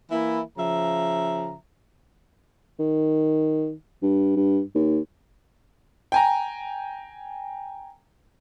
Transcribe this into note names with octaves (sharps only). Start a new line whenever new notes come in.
E3 A#3 E4
C#3 F3 E5 A#5
D#3
G2
G2
D#2
G5 G#5 A#5